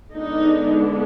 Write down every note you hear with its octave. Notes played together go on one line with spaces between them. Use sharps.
D3 G#3 B3 D4 D#4